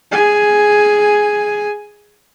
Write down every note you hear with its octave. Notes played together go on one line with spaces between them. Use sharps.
G#4 G#5